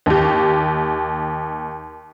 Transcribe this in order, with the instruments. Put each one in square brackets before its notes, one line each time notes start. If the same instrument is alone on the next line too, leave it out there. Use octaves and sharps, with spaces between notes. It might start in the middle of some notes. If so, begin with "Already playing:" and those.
[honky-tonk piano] D#2 G4